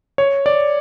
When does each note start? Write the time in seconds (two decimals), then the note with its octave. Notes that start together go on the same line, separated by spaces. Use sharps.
0.18 C#5
0.46 D5